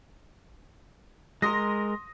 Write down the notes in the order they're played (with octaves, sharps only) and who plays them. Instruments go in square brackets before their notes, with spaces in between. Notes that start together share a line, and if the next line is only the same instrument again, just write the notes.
[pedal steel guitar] G#3 A#4 [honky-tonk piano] C6 D#6 A#6